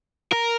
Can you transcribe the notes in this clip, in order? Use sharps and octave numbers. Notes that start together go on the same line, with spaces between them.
A#4